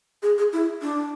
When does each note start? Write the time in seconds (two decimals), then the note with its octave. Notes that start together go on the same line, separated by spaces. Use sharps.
0.23 G#4
0.38 G#4
0.53 E4
0.82 D4